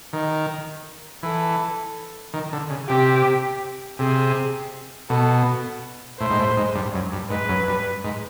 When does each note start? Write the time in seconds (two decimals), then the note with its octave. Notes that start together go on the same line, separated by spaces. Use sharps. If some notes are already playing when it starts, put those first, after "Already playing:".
0.13 D#3
1.23 E3 A4
2.34 D#3
2.52 D3
2.70 C#3
2.89 C3 G4
3.99 C3 G#4
5.09 B2 A4
6.20 A2 C5
6.30 G#2
6.39 A2
6.57 G#2
6.75 G2
6.94 F#2
7.12 G2
7.30 G#2 B4
7.49 F#2
7.67 G2
8.04 G#2